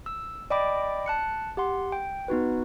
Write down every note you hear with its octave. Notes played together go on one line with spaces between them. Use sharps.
E6
D5 D#5 G5 B5 D6
A5 F#6 C#7
G4 F#5 C6
G5
B3 D#4 F#4 B4